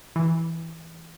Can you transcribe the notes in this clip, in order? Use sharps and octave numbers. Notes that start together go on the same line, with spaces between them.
E3